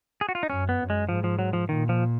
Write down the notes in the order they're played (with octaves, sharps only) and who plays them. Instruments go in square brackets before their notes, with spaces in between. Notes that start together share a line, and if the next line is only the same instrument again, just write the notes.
[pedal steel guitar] G#4
F#4
F4
D#4
[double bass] F#2 [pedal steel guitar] C#4
[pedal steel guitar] B3
[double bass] F#2
[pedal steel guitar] G#3
[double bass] G#2 [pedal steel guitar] F3
[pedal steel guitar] F3
F#3
F3
[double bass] A#2 [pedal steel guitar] D#3
[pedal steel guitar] F3